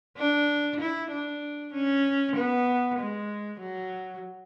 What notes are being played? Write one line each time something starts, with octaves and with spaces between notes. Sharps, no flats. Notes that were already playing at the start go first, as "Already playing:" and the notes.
D4
E4
D4
C#4
B3
G#3
F#3